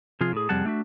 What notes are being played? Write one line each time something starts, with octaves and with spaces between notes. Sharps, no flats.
C3 F3 F4 G#4
A2 G#4
F2 C3 G3 G#4 F#5 A5
A3 D4 F#4 E5